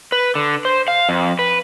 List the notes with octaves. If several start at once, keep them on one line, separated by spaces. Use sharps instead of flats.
B4
D3
C5
F5
F2
B4